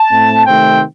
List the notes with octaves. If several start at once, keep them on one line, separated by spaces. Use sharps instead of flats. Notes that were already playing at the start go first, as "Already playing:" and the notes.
Already playing: A5
A2 A3 C4
C3 D#3 A3 C4 G5